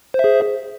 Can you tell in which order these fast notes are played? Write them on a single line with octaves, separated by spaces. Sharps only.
C5 E5 G#4